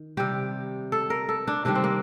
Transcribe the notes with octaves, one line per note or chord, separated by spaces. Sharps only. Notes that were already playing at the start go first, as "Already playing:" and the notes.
Already playing: D#3
C3 G3 G4
A4
A#4
A4
D4
C3 D#3 G3 D4
C4
A#3